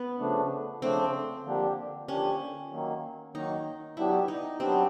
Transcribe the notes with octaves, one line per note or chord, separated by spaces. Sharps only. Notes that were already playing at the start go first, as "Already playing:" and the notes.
Already playing: B3
C#3 F3 A3 D4
C#3 F3 A3 C4 D4
D3 F3 A#3 D4 G4
D3 F3 A#3 C#4 D4 G4
D#3 F#3 A#3
D#3 F#3 A#3 D#4
F#3 B3 D4 E4 G4
D#4
F#3 B3 C4 D4 G4